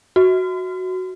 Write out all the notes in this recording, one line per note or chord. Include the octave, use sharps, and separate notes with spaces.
F#4